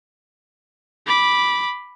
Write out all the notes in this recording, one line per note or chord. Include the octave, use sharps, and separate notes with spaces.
B5 D6